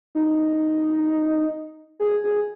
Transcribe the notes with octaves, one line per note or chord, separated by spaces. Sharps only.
D#4
G#4
G#4